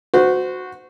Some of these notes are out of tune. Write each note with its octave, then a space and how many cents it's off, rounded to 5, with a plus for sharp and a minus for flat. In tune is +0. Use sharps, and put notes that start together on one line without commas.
F#4 -10 C5 -25